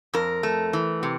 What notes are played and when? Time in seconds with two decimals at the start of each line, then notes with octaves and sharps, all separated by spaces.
0.14 F2 A#4
0.43 A3
0.73 E3
1.03 C3